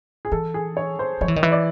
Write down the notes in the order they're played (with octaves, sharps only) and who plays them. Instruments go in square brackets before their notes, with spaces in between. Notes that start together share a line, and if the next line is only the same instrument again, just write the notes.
[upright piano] G#4
[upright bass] E3 [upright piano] A4
[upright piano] G#4
C#5
C5
[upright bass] F3 [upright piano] C#5
[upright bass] E3
[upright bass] D#3 [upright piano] D#5
[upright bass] E3
[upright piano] D5